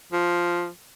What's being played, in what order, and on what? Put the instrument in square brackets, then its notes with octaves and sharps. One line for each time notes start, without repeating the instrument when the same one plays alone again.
[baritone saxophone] F3